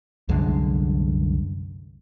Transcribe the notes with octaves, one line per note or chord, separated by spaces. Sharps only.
C2 F#2 D3 G#3